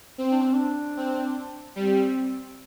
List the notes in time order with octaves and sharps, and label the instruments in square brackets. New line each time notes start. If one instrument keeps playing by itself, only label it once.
[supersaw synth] C4
[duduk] D4
C4
D4
[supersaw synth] C4
[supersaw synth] G3 [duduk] C4